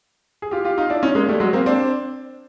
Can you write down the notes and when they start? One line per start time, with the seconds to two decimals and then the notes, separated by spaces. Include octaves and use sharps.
0.42 G#4
0.51 F4 G4
0.65 F4 G4
0.78 D#4 F4
0.90 D4 E4
1.03 C#4 D#4
1.15 G#3 A#3
1.29 G3 A3
1.40 F#3 G#3
1.53 A#3 C4
1.66 C4 D4